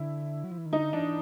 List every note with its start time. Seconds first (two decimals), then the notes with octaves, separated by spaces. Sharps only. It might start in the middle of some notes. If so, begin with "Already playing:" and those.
Already playing: D3 E4
0.44 F#3
0.51 F3
0.58 E3
0.66 D#3
0.73 D3 D#4
0.93 E3 D4